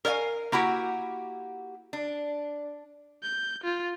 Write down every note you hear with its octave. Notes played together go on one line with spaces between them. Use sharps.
A#4 C#5 D5 F5 G#5
A#3 E4 F#4 G4
D4
G6
F4